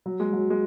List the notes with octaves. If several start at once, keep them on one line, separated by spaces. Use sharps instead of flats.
F#3
G#3
F#3
G#3